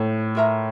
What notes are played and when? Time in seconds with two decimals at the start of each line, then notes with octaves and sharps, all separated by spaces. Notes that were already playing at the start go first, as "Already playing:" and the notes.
Already playing: A2 E4 A4 C5
0.35 F4 A#4 E5 A#5